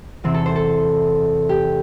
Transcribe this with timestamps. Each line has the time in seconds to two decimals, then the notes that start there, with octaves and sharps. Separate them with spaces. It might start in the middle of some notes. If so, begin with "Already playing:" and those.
0.24 E2 C3 E3 C4
0.34 A4
0.46 C5
0.55 A4
1.49 G4